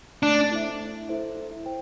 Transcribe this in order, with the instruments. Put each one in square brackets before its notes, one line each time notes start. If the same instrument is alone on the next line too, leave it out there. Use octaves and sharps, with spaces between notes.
[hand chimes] A3 [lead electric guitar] D4
[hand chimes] E4 A4 C5 E5
A3
E4 A4 C5 E5
E4
C5 G5